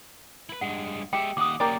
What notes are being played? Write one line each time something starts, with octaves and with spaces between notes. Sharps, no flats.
E4 B4
G2 G#3 F#5
G#3 G4 E5 G5
D#2 F#5 D6 D#6
A#3 C#4 G4 A#4 D5